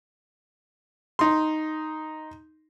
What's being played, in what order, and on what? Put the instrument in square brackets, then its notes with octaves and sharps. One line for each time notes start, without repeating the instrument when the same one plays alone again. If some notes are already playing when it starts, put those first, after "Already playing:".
[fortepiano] D#4 C6